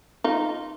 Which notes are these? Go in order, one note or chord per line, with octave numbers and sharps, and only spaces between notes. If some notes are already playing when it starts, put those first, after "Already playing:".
D#4 F4